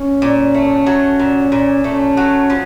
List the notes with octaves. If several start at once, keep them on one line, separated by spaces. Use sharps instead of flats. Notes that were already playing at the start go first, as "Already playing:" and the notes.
Already playing: C#4
A#2
A3
F#3
A#2
A#2
A3 C#4
F#3
F3